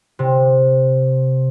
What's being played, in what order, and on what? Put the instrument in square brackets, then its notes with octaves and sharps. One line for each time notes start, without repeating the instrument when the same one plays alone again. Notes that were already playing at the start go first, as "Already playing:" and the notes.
[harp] C3